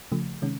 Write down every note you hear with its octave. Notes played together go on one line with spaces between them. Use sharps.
C#3 F3 A3
C3 D#3 G#3 C#4